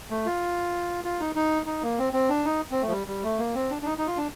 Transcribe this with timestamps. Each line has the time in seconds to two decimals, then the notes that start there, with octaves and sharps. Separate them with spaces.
0.10 A3
0.26 F4
1.05 F4
1.20 D#4
1.35 D#4
1.66 D#4
1.83 A#3
1.99 C4
2.13 C4
2.30 D4
2.45 D#4
2.71 C4
2.82 F3 A3
2.91 G3
3.07 G3
3.23 A3
3.38 A#3
3.55 C4
3.70 D4
3.82 D4
3.86 D#4
3.98 D#4
4.07 F4
4.17 D4